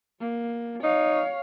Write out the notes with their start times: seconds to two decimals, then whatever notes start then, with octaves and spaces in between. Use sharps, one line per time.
0.20 A#3
0.83 D#4 C#5 F5